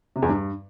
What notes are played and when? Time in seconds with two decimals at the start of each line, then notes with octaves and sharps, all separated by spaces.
0.16 C3
0.22 E2
0.29 G2